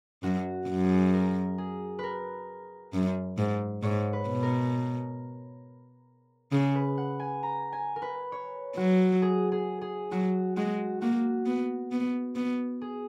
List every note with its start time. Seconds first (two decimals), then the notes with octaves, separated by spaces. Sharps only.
0.23 F#2 F#4
0.68 F#2
0.84 G#4
1.14 A#4
1.58 G#4
1.99 A#4 B4
2.93 F#2
3.38 G#2
3.83 G#2 C#5
4.13 B4
4.28 B2
4.43 A#4
6.52 C#3 G#4
6.75 B4
6.98 F#5
7.20 G#5
7.43 A#5
7.73 G#5
7.96 A#4
8.02 B4
8.32 C#5
8.76 F#3 F#4
9.22 G#4
9.52 G#4
9.81 G#4
10.11 F#3 F#4
10.57 G#3 F#4
11.02 A#3 F#4
11.46 B3
11.92 B3
12.36 B3
12.81 G#4